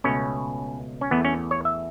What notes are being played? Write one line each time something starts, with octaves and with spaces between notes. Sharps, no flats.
C#2 B2 A3 C#4
C#4
E2 E3 A3 B3
C#4
C#5
E5